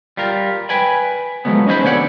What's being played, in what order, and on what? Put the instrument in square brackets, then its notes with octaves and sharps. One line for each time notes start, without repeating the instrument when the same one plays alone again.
[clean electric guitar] G3 F4 A#4
B4 G5 G#5 B5
F3 F#3 G#3 A3 B3
C#4 D#4 E4 C5 B5
D#2 D3 B3 C#5 D5 F#5